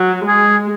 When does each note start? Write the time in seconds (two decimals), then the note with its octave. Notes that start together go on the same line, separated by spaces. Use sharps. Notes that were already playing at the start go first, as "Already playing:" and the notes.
Already playing: F#3
0.28 G#3 G#4